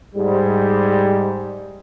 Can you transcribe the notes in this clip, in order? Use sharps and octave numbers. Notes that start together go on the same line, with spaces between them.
G#2 G3